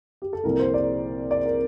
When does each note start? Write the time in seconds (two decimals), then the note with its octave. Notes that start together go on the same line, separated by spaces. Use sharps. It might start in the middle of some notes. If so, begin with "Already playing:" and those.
0.22 G4
0.33 A4
0.44 C2 A#2 F3 A#4
0.59 C5
0.74 D5
1.31 D5
1.45 A#4